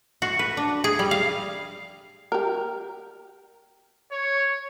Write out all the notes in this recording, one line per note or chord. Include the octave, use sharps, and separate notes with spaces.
F#4
B4
D4
G#4
G3
F5
G4 A#4
C#5